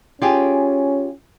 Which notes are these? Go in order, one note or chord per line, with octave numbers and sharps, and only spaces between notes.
C#4 F4 G4 G#4